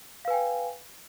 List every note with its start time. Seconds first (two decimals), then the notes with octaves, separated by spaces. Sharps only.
0.25 F5
0.28 B4
0.30 G#5
0.33 G5